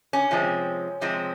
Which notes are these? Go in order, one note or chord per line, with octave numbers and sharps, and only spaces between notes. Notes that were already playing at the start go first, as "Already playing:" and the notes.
C#4
C3 F3 G#3 C4
C3 F3 G#3 C4